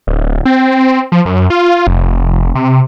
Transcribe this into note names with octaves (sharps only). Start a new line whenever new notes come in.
D1
C4
F3
F#2
F4
F1
C3